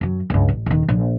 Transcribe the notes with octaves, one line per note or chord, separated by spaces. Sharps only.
F#2 F#3
C#2 G2
A1
D#1 D#3
A#1